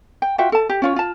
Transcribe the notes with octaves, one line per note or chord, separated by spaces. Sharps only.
G5
F4 F#4 E5 G5
A4 A5
G4
C#4 F4 C#5
F4 A5